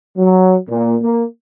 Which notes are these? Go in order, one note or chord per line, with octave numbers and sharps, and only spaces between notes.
F#3
A#2
A#3